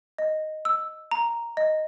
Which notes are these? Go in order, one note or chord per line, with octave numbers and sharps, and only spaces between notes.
D#5
E6
A#5
D#5